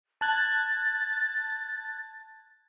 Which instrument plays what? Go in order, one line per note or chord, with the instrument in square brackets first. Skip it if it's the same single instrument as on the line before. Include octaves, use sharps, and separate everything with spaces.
[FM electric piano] A5 F#6 G#6 [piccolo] A6